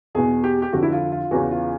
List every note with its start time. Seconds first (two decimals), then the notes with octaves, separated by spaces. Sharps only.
0.15 E2 B2 G#4
0.44 G4
0.62 G4
0.73 F2 D3 F#4
0.83 E4
0.92 F4
1.12 F4
1.31 E2 C#3 E3 F#4
1.51 F4